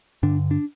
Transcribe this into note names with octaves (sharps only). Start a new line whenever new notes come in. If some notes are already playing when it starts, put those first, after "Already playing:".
G2 D3 D4
D4